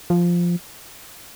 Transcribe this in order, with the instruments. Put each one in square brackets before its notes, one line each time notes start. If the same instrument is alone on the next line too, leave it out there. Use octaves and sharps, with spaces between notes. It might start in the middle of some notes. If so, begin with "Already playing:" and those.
[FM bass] F3